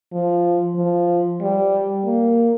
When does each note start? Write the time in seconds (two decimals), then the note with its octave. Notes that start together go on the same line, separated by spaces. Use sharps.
0.12 F3
0.76 F3
1.41 G3
2.04 A#3